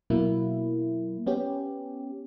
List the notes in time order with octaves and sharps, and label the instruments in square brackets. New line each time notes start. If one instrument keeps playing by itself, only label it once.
[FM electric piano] B2 F#3 A#3 E4
B3 C#4 G4